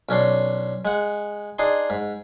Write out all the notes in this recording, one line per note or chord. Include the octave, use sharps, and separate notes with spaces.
B1 C#4 D4 C6
G#3 F#5
D4 D#4 G#4 C6
G#2